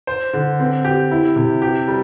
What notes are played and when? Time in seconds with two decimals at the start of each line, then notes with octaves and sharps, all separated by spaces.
0.07 C5
0.33 D3
0.60 C4
0.85 G4
1.11 E4
1.36 C3
1.62 G4
1.88 G3